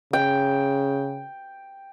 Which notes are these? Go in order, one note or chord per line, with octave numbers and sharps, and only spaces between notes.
C#3 G5